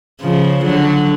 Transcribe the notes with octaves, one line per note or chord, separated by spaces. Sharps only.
C#3 F3
D3 F#3